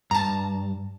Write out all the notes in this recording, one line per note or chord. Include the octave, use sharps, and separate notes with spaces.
G2 A5 A#5